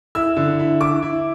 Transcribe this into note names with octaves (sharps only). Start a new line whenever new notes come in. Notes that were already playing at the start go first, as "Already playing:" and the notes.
E4 E6
D3
E4
E4 D6
E4